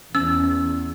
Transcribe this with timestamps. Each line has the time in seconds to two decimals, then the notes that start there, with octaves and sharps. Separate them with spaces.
0.15 E2 C#4 E6